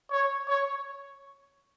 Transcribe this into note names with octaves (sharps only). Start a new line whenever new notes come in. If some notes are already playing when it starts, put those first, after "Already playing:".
C#5
C#5